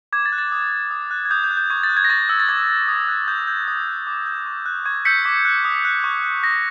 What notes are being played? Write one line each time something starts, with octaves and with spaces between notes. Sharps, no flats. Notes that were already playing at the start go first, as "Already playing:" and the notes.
D6 G#6
A6
F#6
A6
D#6
F#6
D#6
F#6
G#6
D#6 G6
G6
F#6
G6
C#6 G#6
A6
F#6
G#6
A#6
C#6 A6
E6 G6
A6
D6 G#6
F#6
D#6
F#6
D#6 G6
G6
D#6
F#6
D6
G6
C#6
F#6
C#6 G#6
E6 G6 B6 C#7
D6 B6
F#6
D#6
F#6
C#6
F#6
D#6 A#6